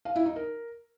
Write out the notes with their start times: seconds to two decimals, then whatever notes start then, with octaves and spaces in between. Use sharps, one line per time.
0.05 F5
0.16 E4
0.26 D#4
0.36 A#4